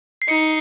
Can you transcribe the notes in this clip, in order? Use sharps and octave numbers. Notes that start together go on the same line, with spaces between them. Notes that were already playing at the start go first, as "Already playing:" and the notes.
C7
D#4 C#7